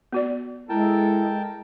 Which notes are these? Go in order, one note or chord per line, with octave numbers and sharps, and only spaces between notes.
B3 F#4 D5
G#3 E4 A4 A#4 G5 A5